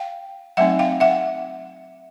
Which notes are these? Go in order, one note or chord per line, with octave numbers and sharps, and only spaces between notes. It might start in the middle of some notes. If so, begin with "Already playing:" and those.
Already playing: F5 G5
F#3 A3 C4 D#4 E5 F#5
F5 G5
E5 F#5